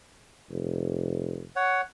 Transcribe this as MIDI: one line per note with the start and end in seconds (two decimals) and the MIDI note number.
0.50 1.46 29
1.56 1.81 73
1.56 1.81 78